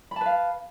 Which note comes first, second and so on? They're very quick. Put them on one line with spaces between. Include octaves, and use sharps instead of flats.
B5 A5 B4 F5